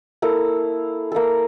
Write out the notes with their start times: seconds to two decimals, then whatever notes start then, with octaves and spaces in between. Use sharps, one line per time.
0.22 A#3 E4 A4
1.12 A#3 E4 A4